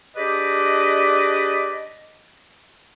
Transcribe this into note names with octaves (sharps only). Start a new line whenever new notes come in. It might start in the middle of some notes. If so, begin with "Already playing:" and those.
D4 G4 G#4 B4 D5 D#5